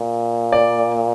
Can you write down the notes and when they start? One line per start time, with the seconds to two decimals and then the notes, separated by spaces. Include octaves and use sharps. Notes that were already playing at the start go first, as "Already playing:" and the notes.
Already playing: A#2
0.52 D5